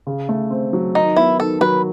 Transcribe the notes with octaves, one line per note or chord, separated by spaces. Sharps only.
C#3
A3
C4
F#3
D#3 D#4
B3 E4
D#3 A4
F#3 B4